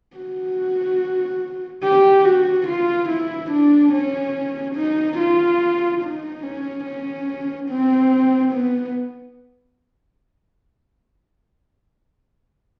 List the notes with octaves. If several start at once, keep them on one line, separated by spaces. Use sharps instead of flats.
F#4
G4
F#4
F4
E4
D4
C#4
D#4
F4
D#4
C#4
C#4
C4
B3